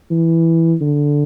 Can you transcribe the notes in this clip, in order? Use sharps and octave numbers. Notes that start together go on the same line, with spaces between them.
E3
D3